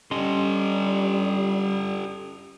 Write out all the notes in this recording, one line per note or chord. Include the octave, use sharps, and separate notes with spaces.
G3 C#4 G4 A4 D#5 C6